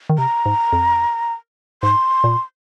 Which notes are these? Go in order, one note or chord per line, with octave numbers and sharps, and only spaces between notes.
D#3
C3 A#5
G#2
F2
G#2 C6
A#2